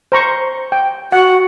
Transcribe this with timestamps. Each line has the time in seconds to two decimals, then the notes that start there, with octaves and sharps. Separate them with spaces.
0.12 C5 A#5 C#6
0.72 G5
1.12 F#4 F#5